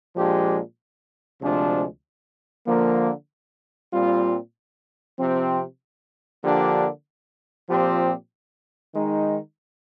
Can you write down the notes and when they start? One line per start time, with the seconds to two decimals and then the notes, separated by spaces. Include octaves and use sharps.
0.15 A#2 F3 G#3 D4 G4
1.41 D2 C3 F3 G#3 D4
2.67 D3 F3 A#3
3.92 A#2 G3 C4 F4
5.18 C3 F3 C4
6.44 D3 F3 A#3 D4 G4
7.69 A#2 F3 C4 G4
8.94 D#3 G#3 D#4